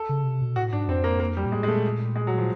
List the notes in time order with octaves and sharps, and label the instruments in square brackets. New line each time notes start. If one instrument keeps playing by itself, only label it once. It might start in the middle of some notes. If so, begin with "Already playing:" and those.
Already playing: [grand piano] A4
[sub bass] C#3
C3
B2
[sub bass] A2 [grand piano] F#4
[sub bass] G#2 [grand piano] D4
[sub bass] F2 [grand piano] C4
[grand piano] A#3
A#3
G3
[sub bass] A#2
[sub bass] A2 [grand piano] G#3
[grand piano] G#3
[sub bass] A#2 [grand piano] A3
[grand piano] G#3
F#3
F3